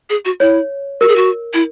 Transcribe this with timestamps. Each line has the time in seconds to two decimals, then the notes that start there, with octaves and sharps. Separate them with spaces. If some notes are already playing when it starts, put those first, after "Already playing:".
0.10 G#4
0.25 F#4
0.40 E4 C#5
1.01 F#4 A#4
1.08 G#4
1.16 F#4
1.54 E4